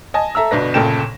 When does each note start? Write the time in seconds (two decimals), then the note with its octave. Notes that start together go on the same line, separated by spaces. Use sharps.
0.14 D#5 G#5 A5
0.35 A4 E5 A#5 E6
0.51 G1 B2 D4 B4 A#6
0.74 G1 A#2 C#3 A4 G5 E7